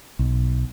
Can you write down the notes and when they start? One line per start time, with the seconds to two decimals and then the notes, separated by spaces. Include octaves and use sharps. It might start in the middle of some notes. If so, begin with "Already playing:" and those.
0.19 B1